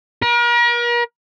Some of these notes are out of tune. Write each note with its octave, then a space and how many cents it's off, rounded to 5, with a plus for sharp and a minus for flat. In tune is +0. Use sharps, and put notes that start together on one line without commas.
A#4 +40